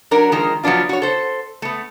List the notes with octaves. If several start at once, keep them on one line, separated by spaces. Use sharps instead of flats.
F#3 D4 A#4
D#3 F3 G#3 A#4
F3 F#3 B3 D4 F4
F#4 C#5
A4 C5
A3 B3